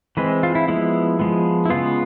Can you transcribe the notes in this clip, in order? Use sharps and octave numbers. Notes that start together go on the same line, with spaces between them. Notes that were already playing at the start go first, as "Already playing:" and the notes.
E3 G#3 C4 B4
F4
E4
F3 G#3 B3 E4
F3 G#3 B3
E4
C#3 F3 G#3 B3 F4